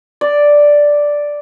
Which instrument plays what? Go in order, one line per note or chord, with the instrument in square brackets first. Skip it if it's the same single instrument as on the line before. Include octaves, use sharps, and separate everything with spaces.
[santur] D5